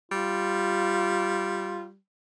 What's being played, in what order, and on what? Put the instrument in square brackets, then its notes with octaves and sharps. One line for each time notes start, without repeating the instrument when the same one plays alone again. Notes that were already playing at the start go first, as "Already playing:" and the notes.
[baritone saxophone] G3 [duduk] F4